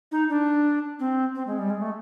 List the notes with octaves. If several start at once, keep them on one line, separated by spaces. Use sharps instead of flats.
D#4
D4
C4
C4
G#3
G3
G#3
A3